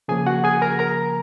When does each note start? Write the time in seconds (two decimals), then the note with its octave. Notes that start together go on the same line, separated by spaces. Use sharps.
0.08 C#3 F3 A#3 G#4 G#5
0.26 F#4 F#5
0.44 G#4 G#5
0.62 A#4 A#5
0.79 A#4 A#5